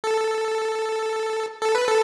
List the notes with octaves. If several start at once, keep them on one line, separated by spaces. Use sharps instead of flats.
A4
A4
B4
A4